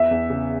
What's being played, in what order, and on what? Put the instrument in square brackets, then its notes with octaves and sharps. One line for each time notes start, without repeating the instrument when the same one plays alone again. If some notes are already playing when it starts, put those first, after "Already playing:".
Already playing: [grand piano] E2 [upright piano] E5
[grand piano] E2
C#3